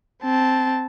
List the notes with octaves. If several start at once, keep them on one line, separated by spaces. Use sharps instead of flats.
C4 A5